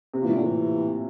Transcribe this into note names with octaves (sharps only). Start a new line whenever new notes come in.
C3
A#2 E3
A2
A#2 D3
E3